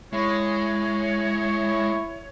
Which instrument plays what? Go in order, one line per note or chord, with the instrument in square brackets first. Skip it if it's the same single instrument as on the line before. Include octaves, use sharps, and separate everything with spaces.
[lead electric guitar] G#3 [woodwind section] E4 C#5